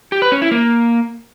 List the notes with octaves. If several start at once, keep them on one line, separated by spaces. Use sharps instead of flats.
G4
B4
C#4
E4
A#3